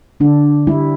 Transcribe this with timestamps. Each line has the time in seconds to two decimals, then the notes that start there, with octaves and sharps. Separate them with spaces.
0.20 D3 D4
0.67 G3 E4